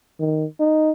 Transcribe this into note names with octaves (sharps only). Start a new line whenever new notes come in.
D#3
D#4